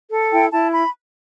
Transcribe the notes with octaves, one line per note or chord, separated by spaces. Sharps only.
A4
E4 G5
E4 A5
B5